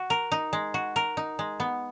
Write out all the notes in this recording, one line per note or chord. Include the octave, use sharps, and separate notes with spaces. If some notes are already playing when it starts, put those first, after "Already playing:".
Already playing: F#4
A#4
D#4
G#3
F#4
A#4
D#4
G#3
B3